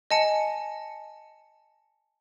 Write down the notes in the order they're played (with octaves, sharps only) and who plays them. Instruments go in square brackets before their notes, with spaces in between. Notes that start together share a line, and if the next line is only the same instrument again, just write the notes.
[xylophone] D#5 G#5 A5 C#7